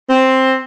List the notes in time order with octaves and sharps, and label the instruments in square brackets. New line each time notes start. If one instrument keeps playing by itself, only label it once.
[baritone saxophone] C4